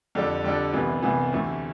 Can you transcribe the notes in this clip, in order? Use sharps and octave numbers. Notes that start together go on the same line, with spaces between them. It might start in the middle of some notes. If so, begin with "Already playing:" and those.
F2 D3 G3 D4 A4
F2 D3 G3 D4 A4
C2 C3 E3 B3
C2 C3 E3 B3
D2 C3 E3 A3